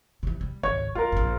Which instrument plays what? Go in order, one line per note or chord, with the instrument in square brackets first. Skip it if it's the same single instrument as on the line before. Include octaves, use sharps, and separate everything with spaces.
[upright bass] C3 E3
G3
[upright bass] G#1 C#2 [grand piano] C#5 G#6
[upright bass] G3 [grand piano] F4 A#4
[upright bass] A#1 G2